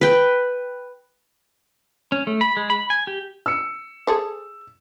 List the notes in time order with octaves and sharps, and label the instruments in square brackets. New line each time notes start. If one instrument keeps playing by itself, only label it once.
[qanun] B4 G5
[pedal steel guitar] C#4
A3
B5
G#3
B5
G#5
G4
[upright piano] E6 C#7
[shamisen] G#4 A4 C5